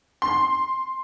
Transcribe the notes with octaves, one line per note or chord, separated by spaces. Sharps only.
C6